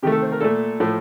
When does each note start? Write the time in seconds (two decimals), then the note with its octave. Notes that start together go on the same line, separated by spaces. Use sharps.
0.03 C3 D#3 A3 G4
0.12 A4
0.22 C5
0.32 A#4
0.41 A#2 A3 A4
0.80 A2 F3 A3